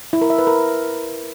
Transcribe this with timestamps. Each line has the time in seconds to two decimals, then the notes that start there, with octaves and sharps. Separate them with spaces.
0.13 E4
0.22 A#4
0.30 E5
0.39 B4
0.47 A#4